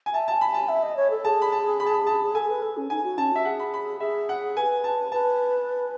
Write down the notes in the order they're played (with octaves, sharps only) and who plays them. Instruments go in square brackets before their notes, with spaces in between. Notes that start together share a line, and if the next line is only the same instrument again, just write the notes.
[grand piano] G#5
[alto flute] E5 [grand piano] A5
[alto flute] G#5 [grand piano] A5
[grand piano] B5
[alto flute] G#5 [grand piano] A5
[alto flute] E5
D#5
C#5
A4
[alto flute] G#4 [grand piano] A5
[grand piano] B5
A5
B5
A5
B5
A5
[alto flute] A4 [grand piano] G#5
[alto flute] B4
A4
C#4
[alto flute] D#4 [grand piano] G#5
[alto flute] F#4
[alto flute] C#4 [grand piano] A5
[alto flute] F#4 [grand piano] E5
[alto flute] G#4 [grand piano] F#5
[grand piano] B5
B5
[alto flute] G#4 [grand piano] E5
[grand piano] F#5
[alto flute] B4 [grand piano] G#5
[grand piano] A5
[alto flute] B4 [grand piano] A5